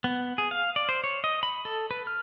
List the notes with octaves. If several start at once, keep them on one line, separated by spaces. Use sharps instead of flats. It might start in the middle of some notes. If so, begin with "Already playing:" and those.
B3
G#4
F5
D5
C5
C#5
D#5
B5
A4
B4
F6